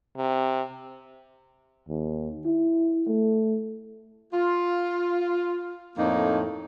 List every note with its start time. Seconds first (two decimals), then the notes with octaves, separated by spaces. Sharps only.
0.17 C3
1.89 D#2
2.45 E4
3.07 A3
4.34 F4
5.97 F2 A2 A#3 D4 D#4